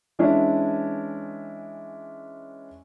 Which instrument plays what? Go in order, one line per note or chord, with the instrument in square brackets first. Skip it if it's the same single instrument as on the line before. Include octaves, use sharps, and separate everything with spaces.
[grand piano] E3 G#3 C#4 D4 E4